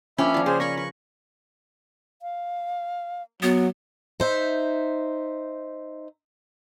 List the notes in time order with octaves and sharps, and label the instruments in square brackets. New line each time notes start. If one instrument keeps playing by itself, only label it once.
[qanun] F3 A#3 [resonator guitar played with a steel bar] C#4 [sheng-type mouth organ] E5 B5 [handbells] G5 D6
[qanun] F3 F4 [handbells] D5
[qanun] C#3 [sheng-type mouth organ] G#4 C5
[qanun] A#4 G#5 B5 [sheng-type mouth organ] C#6 [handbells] A#6
[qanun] B4 [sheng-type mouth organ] C#6
[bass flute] F5
[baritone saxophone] F#3 [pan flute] B3
[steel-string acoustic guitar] D#4 C5 E5